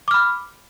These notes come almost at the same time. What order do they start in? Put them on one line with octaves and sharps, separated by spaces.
D6 F6 B5